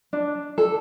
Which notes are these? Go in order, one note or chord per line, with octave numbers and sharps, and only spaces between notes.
D4
A4